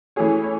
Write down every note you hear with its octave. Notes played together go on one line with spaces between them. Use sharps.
E3 A3 C#4 G#4 C#5
C#5